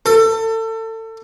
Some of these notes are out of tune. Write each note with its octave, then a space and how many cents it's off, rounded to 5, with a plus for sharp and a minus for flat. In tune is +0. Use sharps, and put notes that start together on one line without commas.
A4 +30